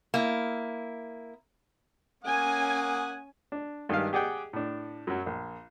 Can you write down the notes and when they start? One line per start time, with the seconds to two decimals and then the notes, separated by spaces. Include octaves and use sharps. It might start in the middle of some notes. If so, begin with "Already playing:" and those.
0.14 A#3 E4
2.25 A#3 C#4 F#5 G#5 D#6
3.52 D4
3.89 G2 D#3 G#3 G4 F5
4.13 G4 G#4 D5 F#5 G5
4.53 A2 D4
5.07 F#2 F#3
5.26 A#1